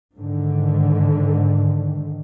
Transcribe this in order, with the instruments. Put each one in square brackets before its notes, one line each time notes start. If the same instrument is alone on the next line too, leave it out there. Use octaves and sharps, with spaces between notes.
[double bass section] G#2 D3 D#3